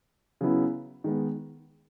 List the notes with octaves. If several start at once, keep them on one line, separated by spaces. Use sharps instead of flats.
C#3 F#3 B3 E4
D#3 G#3 B3